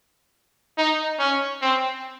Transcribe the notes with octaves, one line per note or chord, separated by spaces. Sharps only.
D#4
C#4
C4